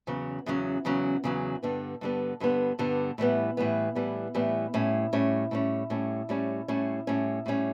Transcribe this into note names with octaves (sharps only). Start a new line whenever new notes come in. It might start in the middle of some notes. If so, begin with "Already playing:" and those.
E2 C#3 F#3 C#4
E2 C#3 F#3 C#4
E2 C#3 F#3 C#4
E2 C#3 F#3 C#4
G2 D3 G3 B3
G2 D3 G3 B3
G2 D3 G3 B3
G2 D3 G3 B3
A2 E3 G3 B3
A2 E3 G3 B3
A2 E3 G3 B3
A2 E3 G3 B3
A2 G3 C#4
A2 G3 C#4
A2 G3 C#4
A2 G3 C#4
A2 G3 C#4
A2 G3 C#4
A2 G3 C#4
A2 G3 C#4